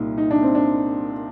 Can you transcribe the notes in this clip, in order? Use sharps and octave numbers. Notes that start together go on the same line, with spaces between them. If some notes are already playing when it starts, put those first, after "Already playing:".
Already playing: C2 A#2 G3 D#4
D#4
D4
C4
D4